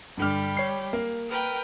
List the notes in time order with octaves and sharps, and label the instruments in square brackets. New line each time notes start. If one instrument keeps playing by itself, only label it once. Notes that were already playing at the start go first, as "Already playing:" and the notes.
[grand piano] G2 D3 F6 [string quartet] G3 G4 B5
[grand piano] C#5 C7
A#3
[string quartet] A#4 B4 G5